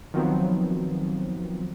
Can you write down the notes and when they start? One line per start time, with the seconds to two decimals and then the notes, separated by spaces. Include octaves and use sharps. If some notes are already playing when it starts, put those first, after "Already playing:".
0.14 D#3 F3 F#3 B3 C4